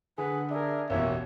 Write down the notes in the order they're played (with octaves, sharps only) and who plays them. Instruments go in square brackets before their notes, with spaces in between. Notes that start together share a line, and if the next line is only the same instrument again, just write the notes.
[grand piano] D3 [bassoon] G#4 [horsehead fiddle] B4 F#5
[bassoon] D4 [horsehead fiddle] G#4 A#4 [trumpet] E5
[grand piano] A1 E2 B2 [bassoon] A#3 [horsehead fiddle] C#5 [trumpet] E5